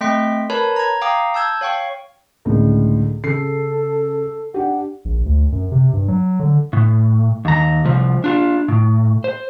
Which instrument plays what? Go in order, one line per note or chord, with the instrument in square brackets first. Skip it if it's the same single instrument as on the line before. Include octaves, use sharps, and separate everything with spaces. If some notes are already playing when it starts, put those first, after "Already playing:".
[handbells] A3 C4 D#5 G5 C6 B6
A#4 B4 C#5 A5 B5
A#5 G#6
F5 G5 A#5 D6 D#6
A5 E6 G6 G#6
C#5 F5 G5 C#6
[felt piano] C#2 A2 D3
[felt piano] C#3 C7 [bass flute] A4
[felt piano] D4 G4 [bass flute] F#5
[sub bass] A#1
D2
F#2
C3
G2
F#3
D3
[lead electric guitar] A2
D#2 A#5
C2 F3
D4 F4
A2
C5